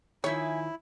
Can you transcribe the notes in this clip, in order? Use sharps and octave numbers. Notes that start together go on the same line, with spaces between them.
D#3 F3 E4 C#5 E5 G#5